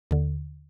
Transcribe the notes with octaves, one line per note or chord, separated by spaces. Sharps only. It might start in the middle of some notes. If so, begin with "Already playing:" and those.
D#2 D3